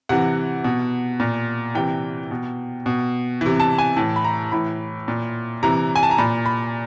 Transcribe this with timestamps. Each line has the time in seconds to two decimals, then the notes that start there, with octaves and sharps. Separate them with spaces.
0.09 C3 E3 F#5
0.64 B2
1.20 A#2
1.75 C3 E3 G5
2.31 B2
2.86 B2
3.41 C3 E3
3.60 A5
3.78 G#5
3.96 A2 E3 A5
4.16 B5
4.25 A#5
4.52 A2 E3 B5
5.08 A#2
5.63 C3 E3 A#5
5.96 G#5
6.03 A5
6.11 A#5
6.18 A#2 B5
6.46 B5